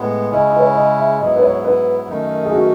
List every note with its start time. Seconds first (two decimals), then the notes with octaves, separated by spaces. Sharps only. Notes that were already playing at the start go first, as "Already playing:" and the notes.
Already playing: A2 G#3 B3
0.31 C#3 G#3 C#4 E4 D#5
0.47 D#5
0.56 B4
0.61 C#5
0.75 D#5
0.98 E5
1.20 G#2 F#3 B3 E4 D#5
1.36 B4
1.43 C#5
1.65 B4
2.09 F#2 D#3 A3 D#4
2.45 G#4
2.53 F#4